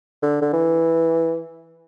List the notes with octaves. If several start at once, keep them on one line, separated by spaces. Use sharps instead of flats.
D3
D3
E3